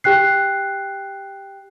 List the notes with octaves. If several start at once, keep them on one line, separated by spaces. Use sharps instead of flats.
G4 G5 F#6 C7